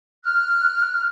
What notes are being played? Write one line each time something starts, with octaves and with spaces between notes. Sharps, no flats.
F6 F#6